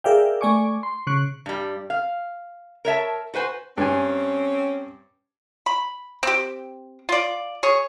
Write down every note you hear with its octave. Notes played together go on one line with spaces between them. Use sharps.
G#4 A#4 D5 E5 F5 G5
A3 D5 G#5 C#6 D6
C6
C#3 C#6 F#6
G2 G3
F5
A#4 C#5 E5 A5
F#4 B4 C5 G#5
G2 C4 C#4 G#5
B5
C4 G4
F4 D5
G#4 C#5